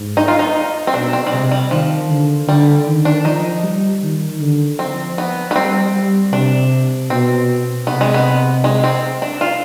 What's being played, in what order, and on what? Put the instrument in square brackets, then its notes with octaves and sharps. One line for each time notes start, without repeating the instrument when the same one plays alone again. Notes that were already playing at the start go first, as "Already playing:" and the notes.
Already playing: [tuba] G#2
[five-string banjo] D#4
F4
D#4
C4
[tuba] B2 [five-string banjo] D4
[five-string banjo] C4
G3
[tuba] C3 [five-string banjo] G#3
[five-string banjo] G3
[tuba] D#3 [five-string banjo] F3
[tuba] D3
[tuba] D3 [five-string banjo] G3
[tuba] D#3
[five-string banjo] D4
[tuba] F3 [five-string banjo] D#4
[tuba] G3
D#3
D3
[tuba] F3 [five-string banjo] C4
[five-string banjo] B3
B3
[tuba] G3 [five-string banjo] C4
[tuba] G3
[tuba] C3 [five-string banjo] D4
[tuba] B2 [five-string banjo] C4
[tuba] C3 [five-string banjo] B3
[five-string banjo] G#3
B3
G#3
C4
D4
F4